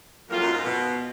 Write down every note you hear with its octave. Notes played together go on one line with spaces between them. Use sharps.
F2 F#3 A#3 F4
F#2
G#2
B2